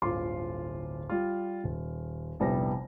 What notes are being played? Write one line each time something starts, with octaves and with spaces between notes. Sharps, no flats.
D1 G1 F4 C6 D6
G3 F4
D#1
F1 A#1 G3 B3 E4 A#6